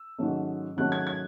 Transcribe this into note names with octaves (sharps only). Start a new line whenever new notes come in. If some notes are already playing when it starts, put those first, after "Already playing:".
Already playing: E6
G#2 D#3 F#3 A3 C#4
G#2 D#3 F#3 A3 C#4 F#6
G#6
G#6